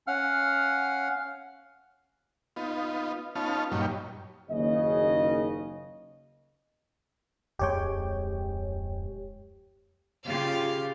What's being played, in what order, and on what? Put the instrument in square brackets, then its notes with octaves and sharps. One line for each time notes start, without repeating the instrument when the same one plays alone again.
[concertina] C#4 F5 F#5 F6
[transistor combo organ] B3 D#4 F4
B3 C#4 D#4 F4 A5 F6
G2 A#2 F#3 D#4 G4 C#5
[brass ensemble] F#1 D#2 C#3 D#5
[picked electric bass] D1 F2 G#3 [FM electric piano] G4 C#5 G5
[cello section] C#3 F4 G4 [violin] F5